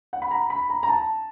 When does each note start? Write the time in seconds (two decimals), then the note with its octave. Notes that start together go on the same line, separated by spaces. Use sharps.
0.13 F#5
0.22 B5
0.31 A#5
0.50 B5
0.70 A#5
0.83 A#5
0.89 A5